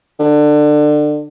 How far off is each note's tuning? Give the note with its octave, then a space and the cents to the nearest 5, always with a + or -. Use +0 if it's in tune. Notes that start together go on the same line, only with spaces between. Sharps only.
D3 +25